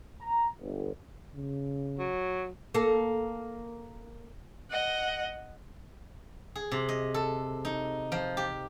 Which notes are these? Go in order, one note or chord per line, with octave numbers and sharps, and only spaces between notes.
A#5
G1
C#3
F#3
A#3 A4
D#5 F#5
G#4
C3
D#5
A4
D#4
F3
G4